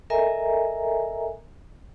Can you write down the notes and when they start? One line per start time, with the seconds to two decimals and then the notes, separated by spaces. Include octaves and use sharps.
0.10 A4 A#4 D#5 E5 G#5 A#5